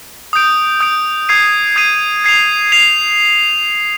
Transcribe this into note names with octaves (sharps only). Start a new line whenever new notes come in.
D#6 G6 D7
D#6 G6 D7
D#6 G#6 C7 D#7
D#6 G#6 C7 D#7
G#6 C7 F7
G#6 C7 F7